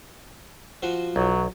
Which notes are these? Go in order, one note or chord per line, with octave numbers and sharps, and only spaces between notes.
F3 F#4 C5
B1 F#3